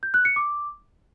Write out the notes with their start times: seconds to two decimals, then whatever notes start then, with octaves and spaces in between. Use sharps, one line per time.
0.03 G6
0.14 F#6
0.25 C#7
0.36 D6